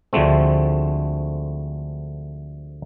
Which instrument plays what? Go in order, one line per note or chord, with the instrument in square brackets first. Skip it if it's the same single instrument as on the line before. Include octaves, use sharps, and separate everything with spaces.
[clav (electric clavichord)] D2 D3 F3 G#3 A3 C4